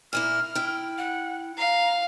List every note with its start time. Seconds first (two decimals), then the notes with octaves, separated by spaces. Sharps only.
0.13 A#2 A#3 E4 F6
0.55 E4 G5
0.98 F#5
1.58 F5 A#5